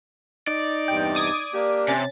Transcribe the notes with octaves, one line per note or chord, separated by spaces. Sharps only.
D#4 D5
E2 G2 C3 G5
D6 D#6 G#6
A#3 D4 G4
C3 C#4 A6